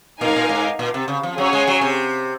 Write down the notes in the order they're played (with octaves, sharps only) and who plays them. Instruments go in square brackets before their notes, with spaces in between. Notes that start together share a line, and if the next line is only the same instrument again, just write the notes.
[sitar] A#2 [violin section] D#4 A#4 F5 G#5
[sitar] G#2
A#2
G#2
A#2
C3
C#3
F3
[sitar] F#3 [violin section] C#4 G#4 C#5 G#5
[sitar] G#3
F#3
C3